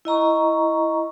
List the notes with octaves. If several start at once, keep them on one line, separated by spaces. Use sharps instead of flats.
E4 D#5 A#5 C#6